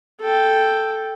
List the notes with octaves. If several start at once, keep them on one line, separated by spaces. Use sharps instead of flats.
A4 G5